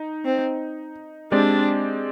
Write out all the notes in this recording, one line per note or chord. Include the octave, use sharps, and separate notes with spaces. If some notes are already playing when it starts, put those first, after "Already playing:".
Already playing: D#4
C4
G#3 C4 D4 G4 D5